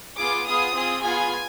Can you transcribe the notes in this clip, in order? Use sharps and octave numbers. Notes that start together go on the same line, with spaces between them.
B3 F4 G#4 D6
B3 F4 G#4 D#6
C4 F4 G#4
B3 F4 G#4 G#5